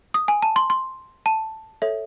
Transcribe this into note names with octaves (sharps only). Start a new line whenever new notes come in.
D#6
G#5
A5
C6
C6
A5
A4 C#5 E5